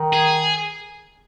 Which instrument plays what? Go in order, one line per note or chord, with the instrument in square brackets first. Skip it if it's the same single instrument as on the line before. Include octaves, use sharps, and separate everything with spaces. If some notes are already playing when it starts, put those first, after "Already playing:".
Already playing: [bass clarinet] D#3
[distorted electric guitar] G#4